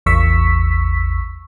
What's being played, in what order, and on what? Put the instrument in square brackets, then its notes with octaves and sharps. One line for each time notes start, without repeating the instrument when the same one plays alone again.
[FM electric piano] A1 E2 C#6 E6 B6